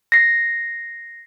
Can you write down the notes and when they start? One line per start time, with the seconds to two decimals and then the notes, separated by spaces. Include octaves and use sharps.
0.12 A#6 C7